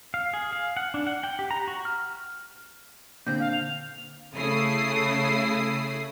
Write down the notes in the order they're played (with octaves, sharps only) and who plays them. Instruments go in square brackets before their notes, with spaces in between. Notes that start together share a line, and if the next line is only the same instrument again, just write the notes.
[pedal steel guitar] F5
G#4
F5
F#5
D4
F#5
G5
G4
A#5
F#4
F6
[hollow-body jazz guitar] A#2 D3 C4 [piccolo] G6
[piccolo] F5
F7
[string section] C#3 A3 E4 D#6 C7